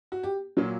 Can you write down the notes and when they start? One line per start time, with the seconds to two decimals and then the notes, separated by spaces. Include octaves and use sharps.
0.12 F#4
0.23 G4
0.57 A#2 F#3 F4